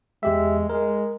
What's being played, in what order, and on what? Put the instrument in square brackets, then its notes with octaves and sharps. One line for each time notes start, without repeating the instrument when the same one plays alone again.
[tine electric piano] E2 G4 E5 [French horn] G#3
[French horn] G#3 [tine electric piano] A#4